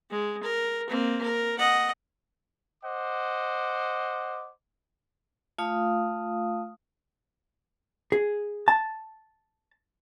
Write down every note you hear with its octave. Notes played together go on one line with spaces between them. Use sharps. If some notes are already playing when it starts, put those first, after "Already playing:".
G#3
A#4
A#3 C4
A#4
D#5 F#5
C5 D#5 F#5 D6
A3 F4 F5 D#6
G#4
A5